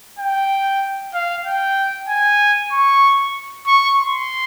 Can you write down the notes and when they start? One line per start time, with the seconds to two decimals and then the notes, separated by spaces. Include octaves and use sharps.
0.19 G5
1.14 F5
1.45 G5
2.09 G#5
2.72 C#6
3.67 C#6
3.98 C6